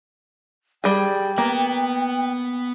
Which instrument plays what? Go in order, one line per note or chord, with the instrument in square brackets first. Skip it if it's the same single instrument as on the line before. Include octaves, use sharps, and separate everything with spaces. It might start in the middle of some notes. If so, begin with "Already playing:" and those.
[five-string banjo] G3 G#4 [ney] G5
[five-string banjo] A#3 [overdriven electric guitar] B3